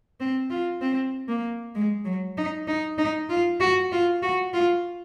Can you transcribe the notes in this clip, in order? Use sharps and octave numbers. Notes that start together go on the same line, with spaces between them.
C4
F4
C4
A#3
G#3
F#3
D#4
D#4
D#4
F4
F#4
F4
F#4
F4